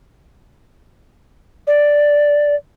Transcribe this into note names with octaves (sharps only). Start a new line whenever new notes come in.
D5